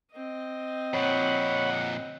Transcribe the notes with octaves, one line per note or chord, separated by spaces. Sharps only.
C4 D#5
F2 A#2 C#5 F#5 B5